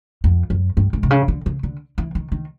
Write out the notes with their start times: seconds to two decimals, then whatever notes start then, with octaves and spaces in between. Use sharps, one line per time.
0.24 F2
0.50 F#2
0.77 G2
0.93 G#2
1.03 C3
1.10 C#3
1.28 D3
1.46 C#3
1.63 D3
1.98 E3
2.15 D#3
2.32 D#3